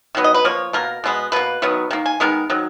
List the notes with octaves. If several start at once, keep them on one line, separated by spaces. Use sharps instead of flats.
D#3 F#3 B3
D#5
B4
F3 A#3 C#5
B2 A#3 A#4
B2 G#3 B3
B2 A#3 B4
D#3 F#3 B3
D#3 A#3
G#5
D#3 G#3 B3 A#4
D#3 F#3